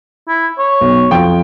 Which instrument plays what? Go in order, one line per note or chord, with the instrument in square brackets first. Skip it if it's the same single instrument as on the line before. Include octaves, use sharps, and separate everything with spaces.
[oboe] E4
C#5
[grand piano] B1
F2 F4 G5